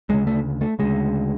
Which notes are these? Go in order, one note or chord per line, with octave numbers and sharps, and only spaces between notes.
D2 C#3 G#3
A3
A3
D2 C#3 G#3